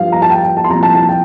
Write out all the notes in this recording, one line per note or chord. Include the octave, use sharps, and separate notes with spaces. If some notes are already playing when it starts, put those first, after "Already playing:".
Already playing: G2 F3 F5
A#5
A5
G5
G5
A5
C6
C2 A#2 F3 A#5
A5
A5
G5